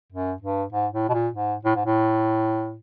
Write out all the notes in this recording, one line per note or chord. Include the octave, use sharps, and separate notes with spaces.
F#2
G2
G#2
A2
B2
A#2
G#2
A2
G#2
A2